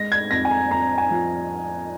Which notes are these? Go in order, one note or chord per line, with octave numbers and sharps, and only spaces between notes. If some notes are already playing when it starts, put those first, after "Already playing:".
Already playing: G#3 A#6
G#6
F2 A#6
G#5
A#5
F2 A#5
G#5
F3